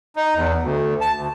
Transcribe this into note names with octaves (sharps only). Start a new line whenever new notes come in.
D#4
E2
D2
A5
D2